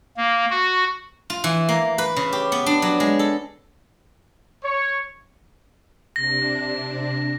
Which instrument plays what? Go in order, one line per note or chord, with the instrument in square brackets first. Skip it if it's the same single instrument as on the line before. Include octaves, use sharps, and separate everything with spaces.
[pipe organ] A#3
F#4
[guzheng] F4
E3
A#3
B4
C#3
G4
B3
D4
F#3
G#3
A4
[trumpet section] C#5
[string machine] C3 D4 [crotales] A#6